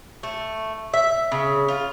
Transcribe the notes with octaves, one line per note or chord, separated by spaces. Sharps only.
A3
E5
C#3
F4